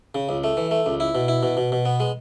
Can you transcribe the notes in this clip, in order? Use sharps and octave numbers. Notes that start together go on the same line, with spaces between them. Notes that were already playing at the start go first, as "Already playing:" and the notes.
C#3
C#2
A3
E3
A3
C#2
E4
B2
E4
B2
B2
B2
B3
G#3